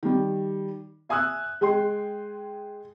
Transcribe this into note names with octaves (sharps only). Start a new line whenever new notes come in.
D#3 G3
E5 G#5 D#6 E6 F#6
G#3 G#4 G5 C6